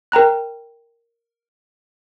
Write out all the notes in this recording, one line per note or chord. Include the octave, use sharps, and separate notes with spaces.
A#4 G5 A#5 F#6